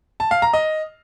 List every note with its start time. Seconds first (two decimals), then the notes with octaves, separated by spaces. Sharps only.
0.20 A5
0.31 F5
0.42 A#5
0.53 D#5